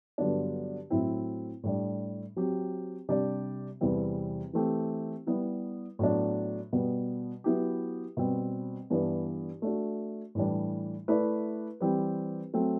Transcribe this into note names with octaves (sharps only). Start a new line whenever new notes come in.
G2 D3 F#3 B3 D4
A2 F#3 C4 E4
A2 G3 D4
F#3 C4 G4
C3 G3 D4 G4 D5
E2 C3 E3 G3 C4
E3 A3 C4 G4
G3 B3 E4
A2 F#3 B3 D4
B2 G3 B3
F#3 B3 E4 G4
B2 G3 C4
G2 E3 B3 D4
A3 D4 F#4
A2 E3 G3 D4
A3 E4 B4 D5
E3 G3 C4 G4 B4
F#3 A3 C4